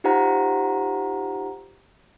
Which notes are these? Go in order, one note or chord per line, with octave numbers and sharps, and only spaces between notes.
D#4 F4 G4 C5 F#5 A#5